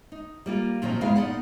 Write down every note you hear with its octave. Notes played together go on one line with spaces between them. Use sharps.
D#4
G3 A#3 F4
A#2 D#3 F3 F#3 C4 D#4
E2 C#3 G#3 B3 E4 F5
A#2 B3 D#4 D5 F#5